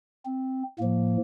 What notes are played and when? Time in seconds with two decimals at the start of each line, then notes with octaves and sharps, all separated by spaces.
0.25 C4
0.79 A2 F3 A#3